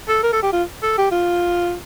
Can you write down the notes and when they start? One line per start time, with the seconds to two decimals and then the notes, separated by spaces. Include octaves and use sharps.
0.08 A4
0.23 A#4
0.33 A4
0.43 G4
0.53 F4
0.83 A4
0.98 G4
1.12 F4